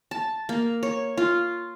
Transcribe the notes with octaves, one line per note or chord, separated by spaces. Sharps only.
A5
A#3
C#5
F4